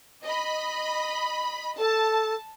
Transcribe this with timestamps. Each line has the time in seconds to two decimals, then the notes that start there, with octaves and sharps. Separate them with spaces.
0.24 D#5 B5
1.78 A4 A5